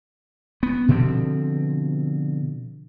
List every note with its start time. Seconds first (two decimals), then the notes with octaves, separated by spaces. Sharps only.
0.63 B3
0.88 B2 D3 F3 C4